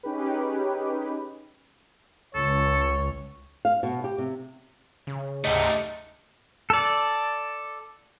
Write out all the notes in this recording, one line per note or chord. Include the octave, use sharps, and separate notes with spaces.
C#4 D#4 G4 G#4 B4
C#2 A4 C#5
F5
B2
G4
C3
C#3
D2 G#2 C3 A3 D#4 D#5
A4 D5